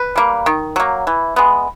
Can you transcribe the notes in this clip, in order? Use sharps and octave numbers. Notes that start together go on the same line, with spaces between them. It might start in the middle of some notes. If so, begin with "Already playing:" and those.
Already playing: B4
G3 A#3
D#3
F#3 A#3
E3
G#3 B3